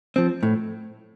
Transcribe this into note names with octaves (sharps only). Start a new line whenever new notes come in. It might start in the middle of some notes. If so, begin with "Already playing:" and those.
F3 C4
A2